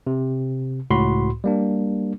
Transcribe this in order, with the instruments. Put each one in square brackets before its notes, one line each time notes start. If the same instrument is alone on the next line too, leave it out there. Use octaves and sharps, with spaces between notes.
[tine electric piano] C3
C#2 A2 F#4 B5 C6
G3 A#3 D4